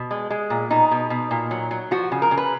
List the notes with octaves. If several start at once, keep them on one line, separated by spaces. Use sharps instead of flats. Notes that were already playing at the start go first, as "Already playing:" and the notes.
Already playing: B2
G#3
G#3
A#2
B2 D#4
B2
B2
A#2
F#3
F#3
F3 F#4
C#3
A#4
C#3
B4